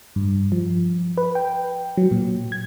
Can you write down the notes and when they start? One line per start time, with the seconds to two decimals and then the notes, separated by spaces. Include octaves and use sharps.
0.16 G2
0.52 F3
1.18 B4
1.35 G5
1.97 F#3
2.11 A#2
2.52 G#6